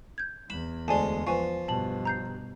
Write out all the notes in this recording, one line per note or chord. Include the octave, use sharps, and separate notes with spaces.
G6 G#6
E2 B5 E7
D2 G#3 D5 G#5 A5
F3 B4 G#5 C#6
G2 B2 A5 F#7
A#5 G6 C7